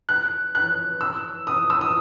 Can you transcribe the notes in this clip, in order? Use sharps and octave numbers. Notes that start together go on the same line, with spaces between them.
F#6
F#6
E6
D#6
E6
D#6